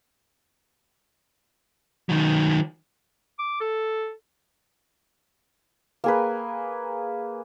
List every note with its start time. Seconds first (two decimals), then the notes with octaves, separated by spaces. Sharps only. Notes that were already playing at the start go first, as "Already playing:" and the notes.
2.09 D#3 F#3
3.39 D6
3.61 A4
6.04 A#3 G#4 B4